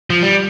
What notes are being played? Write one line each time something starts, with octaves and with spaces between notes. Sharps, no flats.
F3
G3